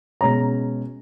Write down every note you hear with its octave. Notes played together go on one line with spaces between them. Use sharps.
B2 G#3 C#4 A#5